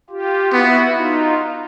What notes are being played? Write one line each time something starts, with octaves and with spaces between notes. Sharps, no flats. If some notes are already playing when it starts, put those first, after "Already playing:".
F4 G4
B3 E4 F#4
D#4 F4